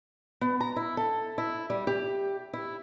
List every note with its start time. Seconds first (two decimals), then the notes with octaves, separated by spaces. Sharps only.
0.41 B3
0.60 A#5
0.76 E4
0.97 A4
1.38 E4
1.70 G3
1.87 G4
2.53 E4